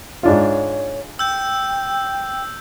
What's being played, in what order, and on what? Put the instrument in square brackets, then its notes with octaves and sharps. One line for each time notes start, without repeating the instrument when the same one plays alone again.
[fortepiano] G#2 D4 F4 [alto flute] C#5
[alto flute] G5 [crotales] E6 G6